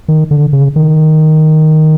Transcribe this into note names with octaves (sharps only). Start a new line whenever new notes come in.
D#3
D3
C#3
D#3